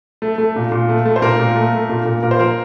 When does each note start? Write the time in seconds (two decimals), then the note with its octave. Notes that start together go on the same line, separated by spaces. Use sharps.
0.22 A3
0.38 A3
0.56 A#2
0.72 A#2
0.89 A3
1.05 A3
1.16 C5
1.22 A#2 A#4
1.39 A#2
1.55 A3
1.73 A3
1.89 A#2
2.05 A#2
2.23 A#2 A#4
2.31 C5
2.39 F3 A#4